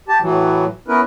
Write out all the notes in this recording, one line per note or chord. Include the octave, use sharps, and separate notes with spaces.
G4 A5
A2 E3 F#3
B3 C#4 E4 A#4 B4